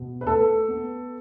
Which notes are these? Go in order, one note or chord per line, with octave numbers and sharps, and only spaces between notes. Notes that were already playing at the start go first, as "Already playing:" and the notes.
Already playing: B2
B4
A3 A4
B3